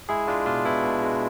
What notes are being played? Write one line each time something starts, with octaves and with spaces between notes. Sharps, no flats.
G#3 E4 G#4
G#3 D4 F4
B2 D4 F4
B2 E4
B2
G#3